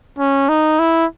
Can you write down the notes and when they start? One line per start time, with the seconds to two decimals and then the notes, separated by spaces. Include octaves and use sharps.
0.19 C#4
0.49 D#4
0.79 E4